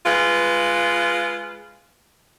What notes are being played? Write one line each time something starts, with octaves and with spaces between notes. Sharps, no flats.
G#3 F4 B4